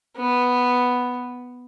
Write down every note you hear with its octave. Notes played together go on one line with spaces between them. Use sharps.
B3